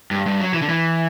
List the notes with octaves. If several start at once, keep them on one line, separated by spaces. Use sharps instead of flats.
G2
G2
F#3
E3
D3
E3